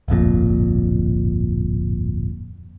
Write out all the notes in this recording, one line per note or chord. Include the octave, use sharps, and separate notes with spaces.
D1 G1 F2 A#2